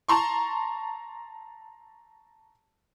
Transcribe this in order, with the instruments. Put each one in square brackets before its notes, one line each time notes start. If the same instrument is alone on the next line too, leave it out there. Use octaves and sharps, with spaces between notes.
[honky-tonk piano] A5 A#5 C6 C#6